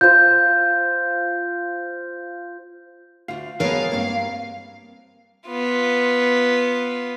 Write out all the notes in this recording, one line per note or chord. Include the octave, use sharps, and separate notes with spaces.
F4 C5 G6
D2 F4 F5
F#3 G#3 B3 A4 A#4 C#5 F5
G2 A#3 C4
B3 F4